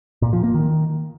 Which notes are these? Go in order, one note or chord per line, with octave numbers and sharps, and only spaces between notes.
A#2
F3
A#3
D#3